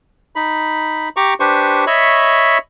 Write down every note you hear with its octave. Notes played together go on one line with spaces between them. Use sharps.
D#4 B5
G4 A#5 C#6 D6
D4 G4 B4 C5 C#6
C#5 D#5 E5 B5 C#6